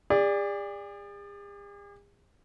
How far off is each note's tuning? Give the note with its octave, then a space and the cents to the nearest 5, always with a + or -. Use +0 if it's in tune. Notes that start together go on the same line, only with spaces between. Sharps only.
G#4 -45 D5 +0